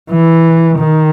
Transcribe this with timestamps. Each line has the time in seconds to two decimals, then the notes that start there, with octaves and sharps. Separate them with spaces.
0.11 E3
0.79 D#3